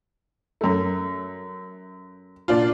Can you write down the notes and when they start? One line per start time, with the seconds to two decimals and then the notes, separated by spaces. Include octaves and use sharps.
0.61 F#2 A3
2.48 A#2 D4 F4